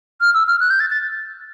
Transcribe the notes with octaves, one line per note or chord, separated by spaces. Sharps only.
F6
E6
F6
F#6
G6
A6
A6